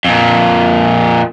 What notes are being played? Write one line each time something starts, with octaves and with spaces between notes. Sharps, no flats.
F2 A#2